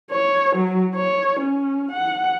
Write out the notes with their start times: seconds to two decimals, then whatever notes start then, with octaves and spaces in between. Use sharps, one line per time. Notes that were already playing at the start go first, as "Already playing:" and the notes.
0.11 C#5
0.56 F#3
0.95 C#5
1.40 C#4
1.91 F#5